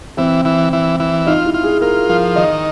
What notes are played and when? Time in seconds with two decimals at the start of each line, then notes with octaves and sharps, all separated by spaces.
0.17 E3 C4
0.45 E3
0.73 E3
1.00 E3
1.26 D#4 F4
1.45 E4
1.54 F4
1.63 G#4
1.81 F4 A#4
2.09 F3 A#4
2.36 D#3 D#5